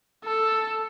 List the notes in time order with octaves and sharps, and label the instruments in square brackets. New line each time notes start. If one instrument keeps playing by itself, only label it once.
[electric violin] A4